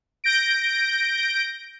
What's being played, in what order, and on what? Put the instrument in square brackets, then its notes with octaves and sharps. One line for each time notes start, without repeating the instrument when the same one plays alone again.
[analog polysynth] G6 A#6 D7